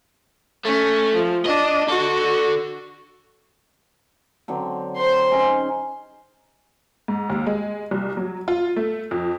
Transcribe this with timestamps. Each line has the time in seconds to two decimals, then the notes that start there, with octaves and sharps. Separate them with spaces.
0.65 A3 C#4
1.14 F3
1.46 D4 D#5
1.88 D3 F#4 A4
4.48 D3 F#3 C4
4.97 C5 C6
5.31 C#4 D#4 G#4
7.08 G#2
7.29 D#2
7.47 G#3
7.91 C2
8.17 F#3
8.48 F4
8.76 A3
9.11 F2